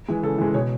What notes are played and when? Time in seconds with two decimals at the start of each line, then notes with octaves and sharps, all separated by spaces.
0.08 E3 G#3
0.23 C#3 A4
0.38 E3 G#3
0.54 B2 C#5